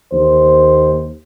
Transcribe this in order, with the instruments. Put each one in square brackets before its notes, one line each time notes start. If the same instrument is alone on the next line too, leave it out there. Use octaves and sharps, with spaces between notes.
[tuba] D#2 [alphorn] C5